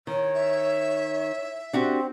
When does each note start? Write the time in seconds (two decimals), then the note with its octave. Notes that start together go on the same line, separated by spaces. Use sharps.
0.07 D#3 C#5
0.35 E5
1.73 C4 D4 F#4 G4